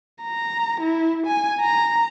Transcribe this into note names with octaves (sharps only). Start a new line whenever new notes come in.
A#5
E4
G#5
A#5